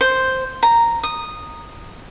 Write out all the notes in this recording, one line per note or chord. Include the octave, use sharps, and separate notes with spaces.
C5
A#5
D#6